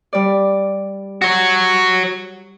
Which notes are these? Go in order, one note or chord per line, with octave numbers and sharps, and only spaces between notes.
G3 D5
F#4 C#5